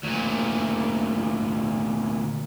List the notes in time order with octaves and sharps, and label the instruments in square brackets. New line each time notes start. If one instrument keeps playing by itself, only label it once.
[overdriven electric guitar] D2 A#2